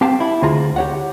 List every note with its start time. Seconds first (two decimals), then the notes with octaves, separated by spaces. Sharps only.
0.01 C4 G4 F5 G5 A5
0.20 E4
0.42 D2 F4 G#4 A#5
0.76 G4 C#5 F#5